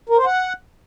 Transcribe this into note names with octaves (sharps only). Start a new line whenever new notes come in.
A#4
C5
F#5